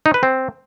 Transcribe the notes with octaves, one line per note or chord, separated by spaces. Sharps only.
D#4
B4
C4